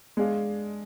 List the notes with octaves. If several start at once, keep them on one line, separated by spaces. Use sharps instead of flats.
G#3 D4 G#4 D5 F5